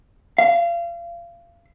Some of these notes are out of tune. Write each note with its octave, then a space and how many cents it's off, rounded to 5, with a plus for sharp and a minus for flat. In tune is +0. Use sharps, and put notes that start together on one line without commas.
F5 -30